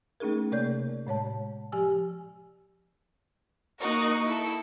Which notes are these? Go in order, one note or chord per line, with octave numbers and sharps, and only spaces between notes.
A3 C#4 D#4 G#4 A#4
C3 A#3 A#4 C#5 D5 G6
C3
A2 G#3 C#5 A5
F3 G4 G#5 E6
A#3 D#4 F#4 A#4
E4 A4